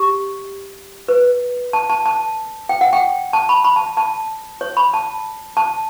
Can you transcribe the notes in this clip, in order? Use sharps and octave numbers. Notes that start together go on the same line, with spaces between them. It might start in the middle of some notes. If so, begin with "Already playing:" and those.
Already playing: G4
B4
A5
A5
A5
G5
F#5
G5
A5
B5
B5
A5
A5
C#5
B5
A5
A5